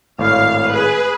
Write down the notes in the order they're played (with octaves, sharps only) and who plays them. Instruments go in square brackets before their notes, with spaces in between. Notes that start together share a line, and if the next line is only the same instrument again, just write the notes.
[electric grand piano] G#1 A2 C#5 [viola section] F5
[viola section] G#4 B4